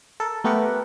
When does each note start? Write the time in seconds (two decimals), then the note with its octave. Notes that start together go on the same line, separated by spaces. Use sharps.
0.20 A4 A#4
0.44 A3 B3 G4 A#4 F#5